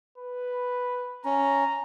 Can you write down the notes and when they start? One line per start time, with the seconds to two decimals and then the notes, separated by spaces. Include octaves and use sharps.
0.18 B4
1.25 C#4 A#5